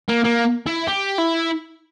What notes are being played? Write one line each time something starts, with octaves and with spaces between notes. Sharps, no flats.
A#3
A#3
E4
G4
E4